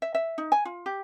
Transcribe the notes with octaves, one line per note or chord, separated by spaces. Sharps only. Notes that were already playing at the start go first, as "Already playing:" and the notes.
E5
E5
D#4
G#5
F4
G4